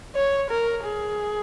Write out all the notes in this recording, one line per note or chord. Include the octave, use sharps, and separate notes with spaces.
C#5
A#4
G#4